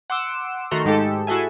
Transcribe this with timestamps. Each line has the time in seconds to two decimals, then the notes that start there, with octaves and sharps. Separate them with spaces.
0.10 F#5 C6 D6 E6
0.71 D#3 A3 F#4 A4 A#5 C6
0.85 G#2 G#3 D#4 G4 A4
1.27 E4 F#4 G#4 A4 E5 G#5